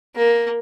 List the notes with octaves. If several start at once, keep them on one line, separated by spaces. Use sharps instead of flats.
A#3